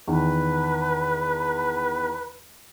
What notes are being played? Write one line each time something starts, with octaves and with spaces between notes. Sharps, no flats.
E2 D#3 B4